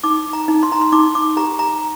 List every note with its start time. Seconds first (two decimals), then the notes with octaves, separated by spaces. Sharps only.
0.04 D#4 D6
0.33 A#5
0.48 D#4
0.63 C6
0.72 A#5
0.81 C6
0.92 D#4 D6
1.15 D6
1.37 G4 A#5
1.59 A#5